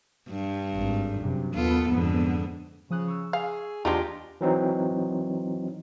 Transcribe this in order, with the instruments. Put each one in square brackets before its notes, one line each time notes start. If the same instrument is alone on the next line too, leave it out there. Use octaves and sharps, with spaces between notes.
[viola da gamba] G2
[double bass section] G#1
F#2 C3
[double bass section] D#2 B3 [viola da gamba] F4 A4
[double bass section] F2 B3 [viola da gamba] G#2 D3
[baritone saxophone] C#3 [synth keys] F3 D#6 F#6
[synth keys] C#6 E6
[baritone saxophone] G#4 [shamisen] F5
[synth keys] E2 B4 A#6 [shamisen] G#3 D#4 [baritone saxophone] D4 [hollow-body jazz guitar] F4 G4
[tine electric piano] E3 F#3 C4 D#4